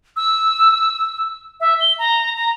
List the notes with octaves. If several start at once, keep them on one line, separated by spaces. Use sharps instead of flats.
E6
E5
G7
A#5
A#5